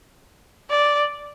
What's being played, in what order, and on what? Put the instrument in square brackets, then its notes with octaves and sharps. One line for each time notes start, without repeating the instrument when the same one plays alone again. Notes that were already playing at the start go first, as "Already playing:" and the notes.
[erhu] D5